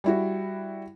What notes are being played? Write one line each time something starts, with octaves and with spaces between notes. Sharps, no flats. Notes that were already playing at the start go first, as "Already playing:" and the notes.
G3 E4 F#4